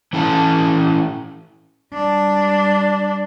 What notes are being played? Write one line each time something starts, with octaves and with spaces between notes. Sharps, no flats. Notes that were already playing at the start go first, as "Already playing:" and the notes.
E3 C#4 E4 A4 E5 A5
G3 D4